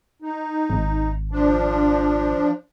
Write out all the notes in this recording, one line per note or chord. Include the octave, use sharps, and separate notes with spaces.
D#4
G#1
F3 D4